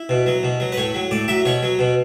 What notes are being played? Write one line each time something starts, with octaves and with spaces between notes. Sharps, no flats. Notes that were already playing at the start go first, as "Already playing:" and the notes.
Already playing: E4
B2
F#3
B2
F#3
B4
A2 C#5
F#3
A2 D5
F#3 E5
B2 C#5
F#3
B2